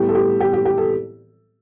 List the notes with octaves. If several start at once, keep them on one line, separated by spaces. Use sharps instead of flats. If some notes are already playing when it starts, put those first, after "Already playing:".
Already playing: A2 G3 B3 G4
A4
G4
G4
G4
G4
A4